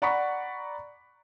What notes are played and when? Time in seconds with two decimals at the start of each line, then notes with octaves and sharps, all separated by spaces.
0.02 D5 F#5 A#5 B5 C#6 B6